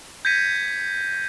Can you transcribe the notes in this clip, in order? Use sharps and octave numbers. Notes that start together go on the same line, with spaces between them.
G6 G#6 A#6 B6 C#7 D#7